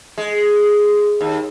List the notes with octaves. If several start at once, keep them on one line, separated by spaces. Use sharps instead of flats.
G#3
D#2